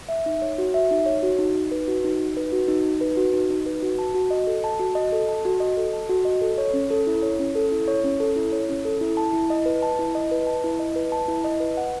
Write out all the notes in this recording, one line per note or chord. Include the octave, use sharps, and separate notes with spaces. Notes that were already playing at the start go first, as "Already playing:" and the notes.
E5
D#4
C#5
F#4
E5
D#4
C#5
F#4
D#4
D#4
B4
F#4
D#4
D#4
B4
F#4
D#4
D#4
B4
F#4
D#4
D#4
B4
F#4
A5
F#4
D#5
A4
A5
F#4
D#5
A4
A5
F#4
D#5
A4
A5
F#4
D#5
A4
C#5
C#4
A4
E4
C#5
C#4
A4
E4
C#5
C#4
A4
E4
C#5
C#4
A4
E4
A5
E4
D#5
B4
A5
E4
D#5
B4
A5
E4
D#5
B4
A5
E4
D#5
B4
F#5